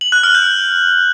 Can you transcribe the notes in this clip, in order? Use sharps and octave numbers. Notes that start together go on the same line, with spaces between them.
F#7
F#6
F6
G6